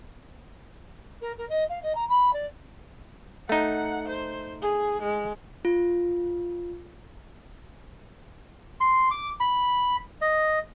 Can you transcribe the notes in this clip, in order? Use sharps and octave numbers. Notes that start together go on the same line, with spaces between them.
A#4
A#4
D#5
F5
D#5
A#5
B5
D5
A3 D#4 F#5
C5
G#4
G#3
F4
C6
D6
B5
D#5